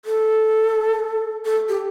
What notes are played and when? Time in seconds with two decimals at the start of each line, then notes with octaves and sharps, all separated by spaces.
0.05 A4
1.45 A4
1.69 G4